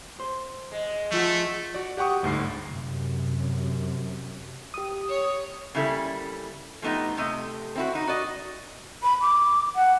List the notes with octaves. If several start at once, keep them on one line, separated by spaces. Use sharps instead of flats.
C5
G#3
F3 A3 F4 F#5
F#4 D5
G4 F#5 G5 C#6 D#6
G1 D2 G#2 C7
F#2 C3
G4 D#6
C#5
C#3 G3 A#3 E4 A4
F3 A3 B3 D#4 G4
C3 A3 D#5
C4 E4 F#4
D#4
F#4 D5 D#5
B5
D6
F#5